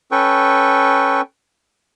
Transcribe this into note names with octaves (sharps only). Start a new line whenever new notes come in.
C#4 A4 B4 G5 C#6